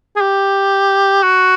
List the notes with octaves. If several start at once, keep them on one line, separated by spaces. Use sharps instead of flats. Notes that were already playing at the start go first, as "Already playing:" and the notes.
G#4
G4
F#4